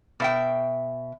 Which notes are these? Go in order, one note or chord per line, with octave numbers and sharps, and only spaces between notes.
B2 E5 G5